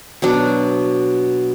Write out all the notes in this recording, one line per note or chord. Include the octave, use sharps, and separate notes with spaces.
B2 F#3 D4